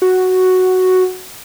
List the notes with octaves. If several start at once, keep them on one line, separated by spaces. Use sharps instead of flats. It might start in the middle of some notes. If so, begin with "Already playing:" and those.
F#4